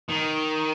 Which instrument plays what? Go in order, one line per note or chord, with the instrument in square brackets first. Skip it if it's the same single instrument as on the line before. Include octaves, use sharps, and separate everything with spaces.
[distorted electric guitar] D#3